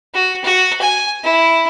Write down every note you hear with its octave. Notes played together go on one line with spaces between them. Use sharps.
F#4
F#4
G#5
E4